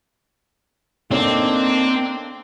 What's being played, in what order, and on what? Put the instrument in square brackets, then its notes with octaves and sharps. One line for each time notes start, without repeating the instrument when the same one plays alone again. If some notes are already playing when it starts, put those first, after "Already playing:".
[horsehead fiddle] A#3 D4 [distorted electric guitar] C4 [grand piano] D#4 A4 C#5